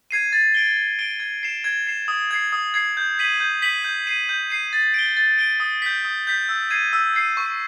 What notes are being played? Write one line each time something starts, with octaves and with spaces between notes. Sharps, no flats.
G#6 C7 D#7
A6
D7 G7
A6
D7 G7
G#6
C7 E7
G#6
C7 E7
D#6
G#6 C7
D#6
G#6 C7
G6
B6 D#7 F#7
G6
B6 D#7 F#7
G6
C7 D#7
G6
C7 D#7
A6
D7 G7
A6
D7 G7
D#6
G6 B6
D#6
G6 B6
E6
G#6 C7 D#7
E6
G#6 C7 D#7
C#6